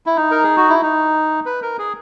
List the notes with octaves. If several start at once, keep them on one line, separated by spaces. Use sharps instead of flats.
E4
D#4
A#4
G#4
F#4
E4
D#4
B4
A#4
G#4